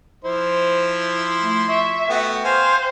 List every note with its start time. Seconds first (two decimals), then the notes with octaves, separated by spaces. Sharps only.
0.24 F3 E4 C5 C6
1.40 A3
1.69 E5 C#6
2.09 A3 B3 F#4 G5
2.45 C5 F5 G#5